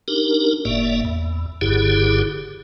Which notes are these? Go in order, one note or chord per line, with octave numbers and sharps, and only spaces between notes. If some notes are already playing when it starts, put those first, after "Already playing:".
D4 D#4 G4 A#4
F#1 A2 A#3 D5 E5
E2
F#1 G2 D3 E4 G4 G#4